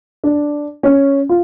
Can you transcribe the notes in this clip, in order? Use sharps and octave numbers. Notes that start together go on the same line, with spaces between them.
D4
C#4
F4